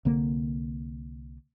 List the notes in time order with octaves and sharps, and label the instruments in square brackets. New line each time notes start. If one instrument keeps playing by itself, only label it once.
[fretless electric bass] C2 D3 A#3